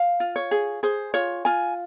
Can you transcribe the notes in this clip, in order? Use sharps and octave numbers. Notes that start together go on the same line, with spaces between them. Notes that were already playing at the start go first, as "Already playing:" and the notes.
Already playing: F5
F4
C#5
G#4
G#4 C5
F4 C#5
F4 G#5